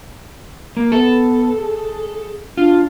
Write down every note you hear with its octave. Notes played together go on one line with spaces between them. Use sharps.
A#3
B3 A4
G#4
D4 F4